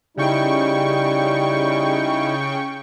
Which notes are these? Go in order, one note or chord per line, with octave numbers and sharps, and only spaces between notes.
C#3 G3 D#4 E4 G5 C#6